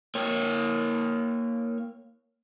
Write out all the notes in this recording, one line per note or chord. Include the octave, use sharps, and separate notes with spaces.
A#3 C#5